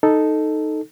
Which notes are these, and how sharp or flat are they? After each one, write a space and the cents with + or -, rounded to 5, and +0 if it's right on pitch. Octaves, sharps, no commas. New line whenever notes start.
D#4 +0 A4 +0